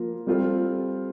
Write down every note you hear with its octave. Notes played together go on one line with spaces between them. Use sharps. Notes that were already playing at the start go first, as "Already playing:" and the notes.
Already playing: F3 A#3 F4
G3 C4 F4 A4